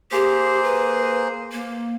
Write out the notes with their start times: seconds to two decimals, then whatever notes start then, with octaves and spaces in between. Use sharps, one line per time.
0.12 A#3 G4 G#4 C5
0.63 B4
1.52 A#3